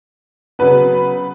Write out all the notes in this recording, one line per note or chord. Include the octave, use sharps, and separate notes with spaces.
C#3 F#3 B3 B4